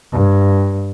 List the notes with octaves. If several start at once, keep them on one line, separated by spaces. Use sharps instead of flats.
G2